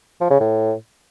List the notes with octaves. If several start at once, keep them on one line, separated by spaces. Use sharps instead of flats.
F3
C#3
A2